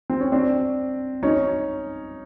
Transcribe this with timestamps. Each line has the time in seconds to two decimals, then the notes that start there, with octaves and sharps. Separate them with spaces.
0.10 C4
0.20 C#4
0.32 C4 D4
1.23 C#4 D#4